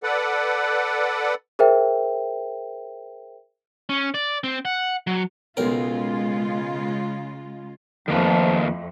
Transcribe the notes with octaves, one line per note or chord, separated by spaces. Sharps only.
A4 B4 D5 F#5
G#4 A#4 C5 E5 G5
C#4
D5
C4
F#5
F#3
B1 C#3 G#3 F4 A#4
F2 D#3 F3 A3 A#3 B4